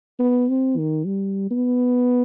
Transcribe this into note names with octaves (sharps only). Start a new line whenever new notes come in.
B3
C4
D#3
G3
B3